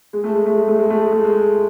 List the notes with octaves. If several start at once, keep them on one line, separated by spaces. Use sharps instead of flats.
G#3
A3
G#3
A3
G#3
A3
G#3
A3
G#3
A3
G#3